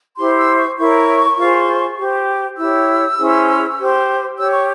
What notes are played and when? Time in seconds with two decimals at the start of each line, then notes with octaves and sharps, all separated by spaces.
0.18 E4 G4 C5 C6
0.38 E6
0.59 C#6
0.78 E4 A#4 C#5 C#6
1.37 F4 G#4 C5
1.98 G4 C5
2.57 E4 G4 C#5 E6
3.17 C#4 E4 G#4 C5
3.78 G4 C5
4.37 G4 C#5 E6
4.53 C#6